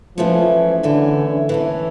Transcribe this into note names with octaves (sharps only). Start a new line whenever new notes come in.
E3 F3 A3 C#4
D3 E3 A3 C#4
E3 A3 C#4